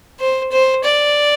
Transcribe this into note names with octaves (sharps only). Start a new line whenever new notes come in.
C5
C5
D5